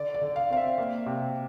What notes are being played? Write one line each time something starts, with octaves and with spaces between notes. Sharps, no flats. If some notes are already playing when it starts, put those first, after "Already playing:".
Already playing: D3 D5
D5
D3
F5
C4 F5
E5
A#3
C3